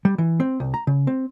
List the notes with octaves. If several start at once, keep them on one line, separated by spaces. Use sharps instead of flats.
G3
E3
C4
C2
A#5
C#3
C4